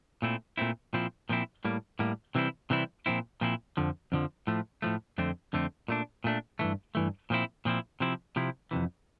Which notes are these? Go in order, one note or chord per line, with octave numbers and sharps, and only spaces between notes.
A#2 A3 C4 E4
A#2 A3 C4 E4
A#2 F3 C4 E4
A#2 F3 C4 E4
A2 G3 A#3
A2 G3 A#3
C3 E3 G3 C4 E4
C3 E3 G3 C4 E4
A#2 F3 C4 E4
A#2 F3 C4 E4
F2 D3 F3
F2 D3 F3
A2 F3 A3
A2 F3 A3
F2 D3 A3 C4
F2 D3 A3 C4
A#2 A3 D4
A#2 A3 D4
G2 E3 A3
G2 E3 A3
A#2 F3 C4 E4
A#2 F3 C4 E4
C3 F3 C4 E4
C3 F3 C4 E4
F2 C3 E3